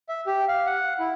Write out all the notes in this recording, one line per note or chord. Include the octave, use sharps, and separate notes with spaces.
E5
G4
F5
F#5
E4